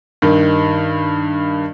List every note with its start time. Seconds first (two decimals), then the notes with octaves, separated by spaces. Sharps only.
0.22 G2 D#3